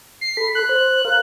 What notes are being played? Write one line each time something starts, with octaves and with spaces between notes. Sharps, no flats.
C7
A4 B5
F#6
C5
A#4 F5